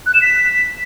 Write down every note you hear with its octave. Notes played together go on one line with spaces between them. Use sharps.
F#6
E7
B6